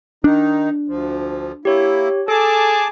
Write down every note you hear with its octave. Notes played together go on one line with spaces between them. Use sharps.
D#3 D4 D#4
D2 F3
A#3 E4 G4 C#5
G#4 A4 A5 D6